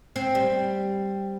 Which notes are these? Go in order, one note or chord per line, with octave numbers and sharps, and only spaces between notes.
C4
G3